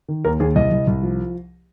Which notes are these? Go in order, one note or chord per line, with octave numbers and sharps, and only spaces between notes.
D#3
D#2 A#4
D#2 G#4
C2 D#5
C2
C2
F3